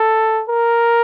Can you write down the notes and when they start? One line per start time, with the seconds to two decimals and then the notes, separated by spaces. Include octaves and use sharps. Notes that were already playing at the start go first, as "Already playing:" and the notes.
Already playing: A4
0.49 A#4